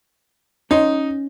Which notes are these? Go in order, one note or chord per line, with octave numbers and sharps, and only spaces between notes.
C#4 D#4 C#5 C6